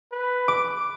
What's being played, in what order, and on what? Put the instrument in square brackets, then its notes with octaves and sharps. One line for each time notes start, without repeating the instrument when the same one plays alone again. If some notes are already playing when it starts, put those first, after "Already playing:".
[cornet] B4
[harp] D6